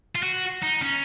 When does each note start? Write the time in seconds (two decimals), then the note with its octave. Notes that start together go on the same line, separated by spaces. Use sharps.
0.15 F4
0.23 F#4
0.63 D#4
0.83 C#4